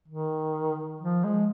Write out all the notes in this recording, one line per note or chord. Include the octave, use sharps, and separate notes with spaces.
D#3
F3
G#3